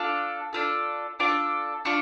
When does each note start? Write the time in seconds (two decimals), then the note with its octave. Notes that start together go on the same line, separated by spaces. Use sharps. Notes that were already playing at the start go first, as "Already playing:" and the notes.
Already playing: D4 F4 A4 F6
0.53 D4 F4 A4
1.20 D4 F4 A4 D6
1.85 D4 F4 C#6